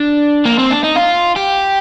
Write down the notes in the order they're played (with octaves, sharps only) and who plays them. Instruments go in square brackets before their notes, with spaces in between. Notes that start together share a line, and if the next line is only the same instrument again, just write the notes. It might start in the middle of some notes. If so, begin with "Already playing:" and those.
Already playing: [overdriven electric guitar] D4
A#3
C4
D4
D#4
F4
G4